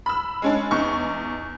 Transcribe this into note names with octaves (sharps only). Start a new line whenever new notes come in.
B5 E6
G#3 C#4 D4
E2 D#4 C#6